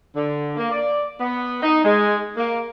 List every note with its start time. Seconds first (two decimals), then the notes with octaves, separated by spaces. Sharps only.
0.15 D3
0.57 A#3
0.71 D5
1.20 B3
1.62 D#4
1.84 G#3
2.37 A#3